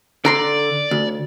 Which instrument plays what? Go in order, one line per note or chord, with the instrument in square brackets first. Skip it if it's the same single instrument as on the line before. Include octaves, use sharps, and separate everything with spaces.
[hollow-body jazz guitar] D3 A#5 C6 [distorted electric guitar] D5
[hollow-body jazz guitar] D2